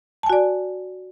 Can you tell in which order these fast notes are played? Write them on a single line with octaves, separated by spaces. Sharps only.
A5 G#5 F#4 D5